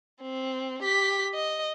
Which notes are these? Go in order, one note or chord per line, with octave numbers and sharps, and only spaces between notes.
C4
G4 B6
D#5